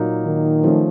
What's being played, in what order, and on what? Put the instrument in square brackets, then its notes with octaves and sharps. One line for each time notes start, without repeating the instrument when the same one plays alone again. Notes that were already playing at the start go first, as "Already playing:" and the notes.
Already playing: [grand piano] A#2 F#3 A#3 D#4
[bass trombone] D#3
[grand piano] F3 A3 C#4